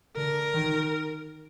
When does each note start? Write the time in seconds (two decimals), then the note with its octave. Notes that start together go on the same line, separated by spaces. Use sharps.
0.16 D3 A#4
0.54 D#3